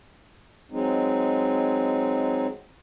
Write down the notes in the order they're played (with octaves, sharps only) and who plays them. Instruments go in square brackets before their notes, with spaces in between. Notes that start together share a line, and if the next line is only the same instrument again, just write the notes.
[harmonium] F#3 G#3 C4 D#4